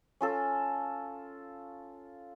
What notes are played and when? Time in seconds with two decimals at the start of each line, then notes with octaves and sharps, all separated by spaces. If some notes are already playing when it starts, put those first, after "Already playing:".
0.21 C#4 F4 A4